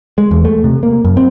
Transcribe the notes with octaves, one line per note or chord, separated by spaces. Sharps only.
G#3
E2
A3
C3
A#3
F#2
C4